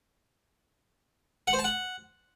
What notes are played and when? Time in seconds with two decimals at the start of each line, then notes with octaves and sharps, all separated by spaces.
1.47 F#5
1.53 C5
1.59 A5
1.64 F#5